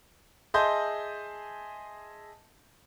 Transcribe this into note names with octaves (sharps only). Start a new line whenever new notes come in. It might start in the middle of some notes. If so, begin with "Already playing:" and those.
G#4 D#5 E5 A5 C6 G6